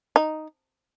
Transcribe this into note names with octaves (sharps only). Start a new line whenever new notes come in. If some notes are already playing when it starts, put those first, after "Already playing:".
D#4